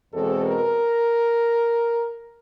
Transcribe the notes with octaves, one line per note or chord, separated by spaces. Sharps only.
E2 B2 G#3 C4 A4
A#4